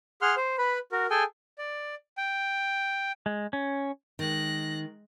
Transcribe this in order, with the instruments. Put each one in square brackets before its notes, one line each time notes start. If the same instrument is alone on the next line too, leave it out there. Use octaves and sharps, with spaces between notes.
[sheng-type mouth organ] G#4 F#5 C6 F6
C5
B4 B5
F#4 A#4
G#4 A4 G5 G#5
D5
G5
[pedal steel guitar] G#3
C#4
[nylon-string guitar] D#3 [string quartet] G#3 F#6 A#6